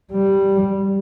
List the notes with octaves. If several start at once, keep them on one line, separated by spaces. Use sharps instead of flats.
G3